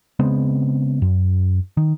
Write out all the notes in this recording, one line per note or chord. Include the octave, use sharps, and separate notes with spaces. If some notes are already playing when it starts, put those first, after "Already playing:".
C#3 G#3 B3 C4
F#2
D#3